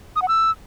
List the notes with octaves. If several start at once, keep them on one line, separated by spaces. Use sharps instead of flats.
D#6
F#5
E6